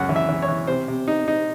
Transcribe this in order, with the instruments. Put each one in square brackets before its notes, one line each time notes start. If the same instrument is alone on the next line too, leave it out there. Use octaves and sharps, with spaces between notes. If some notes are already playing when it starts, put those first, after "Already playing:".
Already playing: [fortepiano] C#2 F#2 F#5
E3
E5
E3
C#5
E3
C3 C5
C3
D#4
D#4